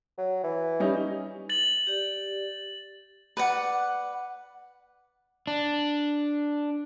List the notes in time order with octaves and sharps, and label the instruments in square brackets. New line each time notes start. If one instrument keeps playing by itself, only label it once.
[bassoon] F#3
E3
[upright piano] G3 C#4 D#4
[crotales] A6 F#7
[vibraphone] G4 D5
[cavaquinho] B4 D5 F#5
[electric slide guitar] D4